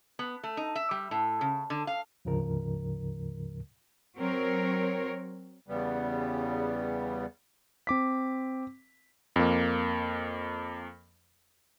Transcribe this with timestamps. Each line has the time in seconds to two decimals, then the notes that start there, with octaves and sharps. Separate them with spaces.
0.19 B3
0.43 A3
0.57 D#4
0.76 E5
0.91 G3
1.11 A2
1.41 C#3
1.70 D3
1.87 F5
2.25 D2 G#2 C#3 F3 A#4
4.18 F#3 C4 A#4 C#5
5.67 E2 C#3 G3 B3
7.87 C4 D6 B6
9.36 F2 A#3